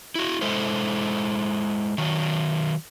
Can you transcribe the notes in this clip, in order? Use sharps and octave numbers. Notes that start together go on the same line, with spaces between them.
E4 F#4
G#3 E4 A4 C5
D#3 F#3